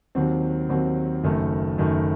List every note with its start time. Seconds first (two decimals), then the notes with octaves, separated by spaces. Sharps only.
0.15 D#2 D#3 F#3 C4
0.69 D#2 D#3 F#3 C4
1.24 F#1 F#2 D#3 A3
1.78 F#1 F#2 D#3 A3